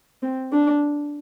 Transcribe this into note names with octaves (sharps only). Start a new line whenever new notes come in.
C4
D4